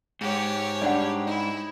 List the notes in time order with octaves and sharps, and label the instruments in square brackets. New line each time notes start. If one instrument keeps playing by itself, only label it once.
[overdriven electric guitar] G#2 [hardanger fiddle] G4 C#5
[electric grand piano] G3 D4 [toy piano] D5 F#5
[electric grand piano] D#4 [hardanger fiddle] E4